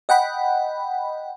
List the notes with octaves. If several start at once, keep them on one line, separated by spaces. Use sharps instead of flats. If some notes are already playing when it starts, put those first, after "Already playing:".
D#5 F#5 G5 B5